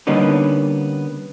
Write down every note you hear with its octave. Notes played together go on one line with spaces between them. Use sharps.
D3 G3 A#3 B3 C#4 D#4